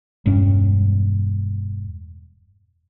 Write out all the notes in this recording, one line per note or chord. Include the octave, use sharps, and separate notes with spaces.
E1 G2 C#4